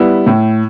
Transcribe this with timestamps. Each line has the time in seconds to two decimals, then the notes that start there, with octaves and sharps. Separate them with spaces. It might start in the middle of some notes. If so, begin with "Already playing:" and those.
Already playing: G3 B3 E4
0.27 A2